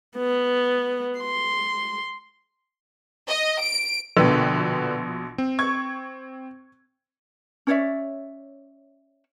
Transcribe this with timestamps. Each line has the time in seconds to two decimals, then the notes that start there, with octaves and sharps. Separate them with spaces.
0.17 B3
1.20 C6
3.28 D#5
3.61 D7
4.17 A#1 B2 D3 B4 G5
5.38 C4
5.59 C#6 G#6
7.67 C#4 C#5 D5 E5